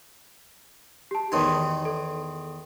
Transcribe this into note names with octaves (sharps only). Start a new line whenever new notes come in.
G4 A5
E2 D#3 D#4 C#5 C6
A4